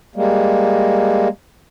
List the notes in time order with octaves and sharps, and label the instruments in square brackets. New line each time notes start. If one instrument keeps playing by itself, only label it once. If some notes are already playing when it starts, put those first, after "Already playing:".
[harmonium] G3 G#3 A#3